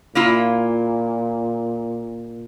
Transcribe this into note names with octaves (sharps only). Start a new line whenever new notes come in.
A#2 A#3 E4 F4